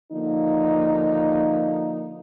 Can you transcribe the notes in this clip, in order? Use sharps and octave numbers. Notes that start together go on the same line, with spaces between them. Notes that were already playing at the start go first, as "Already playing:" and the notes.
D3 F3 A#3 D#4